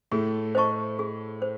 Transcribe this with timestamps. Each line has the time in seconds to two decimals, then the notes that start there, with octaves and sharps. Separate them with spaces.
0.12 A2 A3 G#4
0.55 C5 D#5 A5 C#6
0.99 G#4
1.42 C5